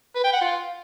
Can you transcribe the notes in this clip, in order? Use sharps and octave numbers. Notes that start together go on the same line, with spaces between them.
B4
G5
F#5
F4